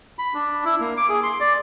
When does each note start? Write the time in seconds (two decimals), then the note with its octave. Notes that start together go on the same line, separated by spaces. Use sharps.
0.19 B5
0.34 D4
0.65 E4
0.80 A#3
0.97 D6
1.09 G#4
1.23 C6
1.40 D5